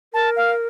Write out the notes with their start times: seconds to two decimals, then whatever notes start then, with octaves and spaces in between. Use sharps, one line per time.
0.13 A#4 A5
0.36 F5